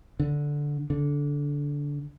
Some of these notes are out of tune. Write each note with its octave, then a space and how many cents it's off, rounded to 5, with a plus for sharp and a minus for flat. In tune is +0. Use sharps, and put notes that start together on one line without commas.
D3 -5
D3 -20